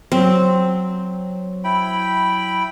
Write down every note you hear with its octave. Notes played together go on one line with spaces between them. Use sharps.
F#3 C4
E4 G5 B5